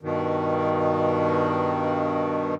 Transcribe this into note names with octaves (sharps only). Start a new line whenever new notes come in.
G2 B2 D#3